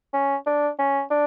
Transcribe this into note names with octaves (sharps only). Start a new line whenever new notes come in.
C#4
D4
C#4
D4